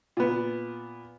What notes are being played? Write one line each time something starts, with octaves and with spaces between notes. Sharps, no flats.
A#2 B3